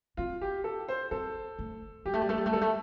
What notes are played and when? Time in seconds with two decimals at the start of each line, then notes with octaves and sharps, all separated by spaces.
0.17 C4 F4
0.41 G4
0.64 A4
0.89 C5
1.11 C4 A4
1.59 A3
2.05 G3 G4
2.14 A3
2.22 G3
2.29 A3 A4
2.37 G3
2.46 A3
2.53 G3 A4
2.61 A3